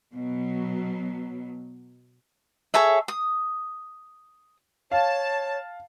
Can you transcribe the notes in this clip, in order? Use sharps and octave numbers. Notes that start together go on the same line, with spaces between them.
B2 F#3
G#4 A4 C#5 E5
D#6
C#5 F5 A5